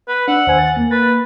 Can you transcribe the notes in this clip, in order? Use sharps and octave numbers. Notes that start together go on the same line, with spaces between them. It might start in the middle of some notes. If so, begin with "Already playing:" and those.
B4
D4 F#5 E6
D#2 C5 G#5
A6
A#3
B4 B5 A6